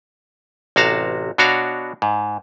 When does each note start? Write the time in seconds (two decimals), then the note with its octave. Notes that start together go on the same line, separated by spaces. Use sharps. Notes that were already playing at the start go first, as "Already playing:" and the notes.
0.76 A1 C3 F#4 F5 A5 A#5
1.38 B2 D4 F#4 C#5 F5 A#5
2.02 G#2